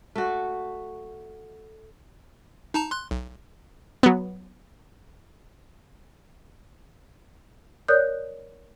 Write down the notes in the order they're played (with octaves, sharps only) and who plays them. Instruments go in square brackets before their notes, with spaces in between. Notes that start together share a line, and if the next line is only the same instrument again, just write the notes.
[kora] A3 F#4
[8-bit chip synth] D#4 A5 A#5
C6 F#6
B1
[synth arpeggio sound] F#3 B3
[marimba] A#4 C#5 D5 D#6 F#6 G6